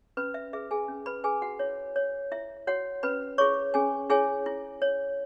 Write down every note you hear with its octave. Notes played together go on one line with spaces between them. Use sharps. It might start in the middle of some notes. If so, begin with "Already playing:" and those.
C#4 B4 B5
E5
G#4 B4 E5
G#4 G#5
C#4
B4 B5
G#4 B4 G#5
F#4 F#5
E4 C#5
C#5
E4 E5
F#4 C#5 F#5
C#4 B4 B5
E4 G#4 C#5 C#6
C#4 G#4 G#5
E4 G#4 C#5 G#5
E4
C#5